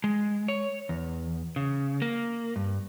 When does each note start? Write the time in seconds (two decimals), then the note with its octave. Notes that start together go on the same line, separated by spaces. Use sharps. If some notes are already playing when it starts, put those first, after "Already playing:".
0.04 G#3
0.48 C#5
0.89 E2
1.56 C#3
2.02 A#3
2.56 G2